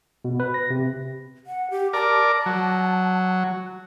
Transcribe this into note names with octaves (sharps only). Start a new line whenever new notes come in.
B2
B4
A#6
C3
F#5
G4
A#4 D5 A5
F#3